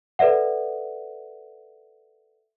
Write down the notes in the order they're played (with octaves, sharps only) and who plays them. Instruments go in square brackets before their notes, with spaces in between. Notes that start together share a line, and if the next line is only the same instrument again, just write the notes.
[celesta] A4 B4 D5 E5 F#5